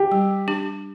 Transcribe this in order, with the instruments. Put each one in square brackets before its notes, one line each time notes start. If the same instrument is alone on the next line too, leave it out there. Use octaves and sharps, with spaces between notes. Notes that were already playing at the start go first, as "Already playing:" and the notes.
Already playing: [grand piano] G4
[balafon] G3
D4 G4